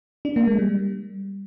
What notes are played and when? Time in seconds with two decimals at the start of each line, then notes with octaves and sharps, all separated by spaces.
0.25 D4
0.36 A#3
0.47 G#3
0.59 G3